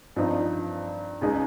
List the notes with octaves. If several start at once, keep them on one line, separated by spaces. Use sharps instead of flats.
G2 F3 C4 D#4
C#2 C#3 G#3 D#4